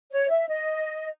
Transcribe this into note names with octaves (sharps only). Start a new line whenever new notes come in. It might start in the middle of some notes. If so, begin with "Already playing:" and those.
C#5
E5
D#5